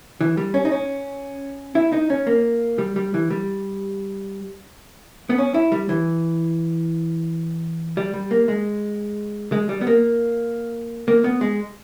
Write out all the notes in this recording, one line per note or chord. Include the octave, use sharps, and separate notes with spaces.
E3
G3
C#4
D#4
C#4
E4
D#4
C#4
A#3
G3
G3
E3
G3
B3
C#4
E4
G3
E3
G3
G3
A#3
G#3
G#3
G3
B3
A#3
A#3
B3
G#3